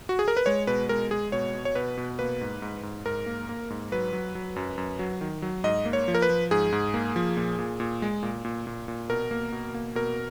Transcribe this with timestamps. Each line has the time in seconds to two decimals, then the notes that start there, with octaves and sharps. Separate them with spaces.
0.09 F#4
0.19 G#4
0.28 A#4
0.37 B4
0.46 G#3 C#5
0.67 B2 B4
0.89 G#3 A#4
1.11 G#3 G#4
1.32 B2 C#5
1.55 B2
1.65 C#5
1.75 B2 B4
1.97 B2
2.19 A#3 B4
2.41 G#2
2.62 G#2
2.83 G#2
3.06 G#2 A#4
3.26 A#3
3.49 A#3
3.70 G#2
3.92 F#3 B4
4.13 F#3
4.35 F#3
4.56 F#2
4.78 F#2
4.99 F#3
5.21 D#3
5.42 F#3
5.64 G#2 D#5
5.85 A#3
5.93 C#5
6.08 F3
6.15 A#4
6.22 B4
6.29 F3
6.51 G#2 G#4
6.72 G#2
6.94 A#3
7.16 F3
7.37 A#2
7.59 A#2
7.80 A#2
8.02 G#3
8.23 A#2
8.45 A#2
8.67 A#2
8.88 A#2
9.10 B2 A#4
9.31 A#3
9.52 B2
9.74 A#3
9.95 B2 A#4